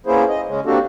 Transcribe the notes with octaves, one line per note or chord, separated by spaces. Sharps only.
A#3 B3 C#4 E4 G#4 C5
D#5
C#3 G#3 C#4
A#3 C4 D4 F#4 G4 A4